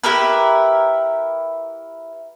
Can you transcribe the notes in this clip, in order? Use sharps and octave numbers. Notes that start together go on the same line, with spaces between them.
E4 G4 A#4 B4